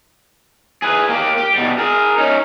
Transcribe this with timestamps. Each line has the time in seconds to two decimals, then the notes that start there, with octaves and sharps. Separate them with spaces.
0.82 G#4 B4
1.09 A#3 G4
1.37 G4
1.54 B2 G3
1.78 G#4 A#4
2.18 C#4 D#4